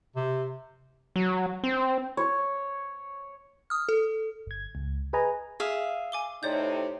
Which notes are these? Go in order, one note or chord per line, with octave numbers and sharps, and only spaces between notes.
C3
F#3
C4
C#5
D#6 F6
A4
G1 G#6
C#2
G#4 B4 D#5 G#5 A#5
G#4 E5 F5
G#5 D6 G7
A2 C3 D#4 C#5 D5 G6